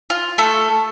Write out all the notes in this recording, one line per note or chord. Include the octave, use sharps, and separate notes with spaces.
F4
A3 A4